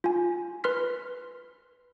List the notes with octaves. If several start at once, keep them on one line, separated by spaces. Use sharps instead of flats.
F4 G#5
B4 C6 F6 B6